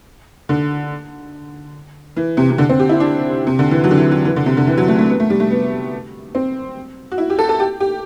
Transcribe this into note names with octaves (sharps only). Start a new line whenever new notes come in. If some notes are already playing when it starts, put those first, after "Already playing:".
D3
E3
C3
C3
D3
C4
G4
E4
D4
C3
D3
E3
F#3
D3
E3
F#3
E3
D3
C3
D3
E3
F#3
A3
A3
B3
A3
G3
A3
B3
C4
F#4
E4
G4
A4
A4
G4
G4